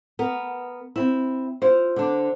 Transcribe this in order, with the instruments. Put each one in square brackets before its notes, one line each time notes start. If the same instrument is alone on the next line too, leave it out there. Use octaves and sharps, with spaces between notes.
[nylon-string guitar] B3 A#4
C4 E4
[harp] E4 C5 [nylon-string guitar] F4
[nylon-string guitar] D3 D4